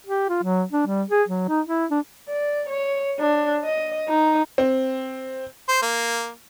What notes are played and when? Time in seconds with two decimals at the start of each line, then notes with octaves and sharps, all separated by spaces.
0.07 G4
0.29 F4
0.43 F#3
0.72 D4
0.87 G3
1.10 G#4
1.28 F#3
1.49 D#4
1.66 E4
1.91 D4
2.29 D5
2.70 C#5
3.19 D4
3.65 D#5
4.09 D#4
4.58 C4
5.68 C5
5.82 A#3